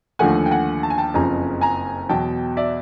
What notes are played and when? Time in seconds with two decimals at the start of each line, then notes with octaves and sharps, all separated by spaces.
0.19 D#2 D3 F3 A3 F#5 G#5
0.46 G5
0.51 F#5 G#5
0.83 A5
0.90 G#5
0.98 G5 A5
1.14 F#1 F2 C#3 F3 G#5 A#5
1.61 G#5 A#5
2.09 E2 B2 F#3 G5 A5
2.57 D5 E5